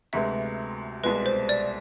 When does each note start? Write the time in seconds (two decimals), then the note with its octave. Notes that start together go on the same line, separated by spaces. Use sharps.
0.13 D2 C3 G#3 B3 E5
1.03 C2 B2 G#3 B4
1.26 C5
1.49 D5